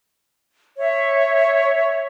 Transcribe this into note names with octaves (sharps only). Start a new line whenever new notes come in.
C#5 E5